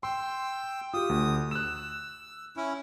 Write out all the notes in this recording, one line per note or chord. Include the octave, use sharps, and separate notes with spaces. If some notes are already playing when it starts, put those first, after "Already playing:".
G5 C6 E6
F4 G4 D#6
D2
E6 F#6 E7
C#4 E4